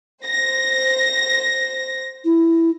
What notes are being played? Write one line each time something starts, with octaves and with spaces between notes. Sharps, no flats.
C5 A#6
E4